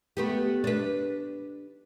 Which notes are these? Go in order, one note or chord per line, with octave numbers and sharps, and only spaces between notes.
A3 B3 G4
D4 B4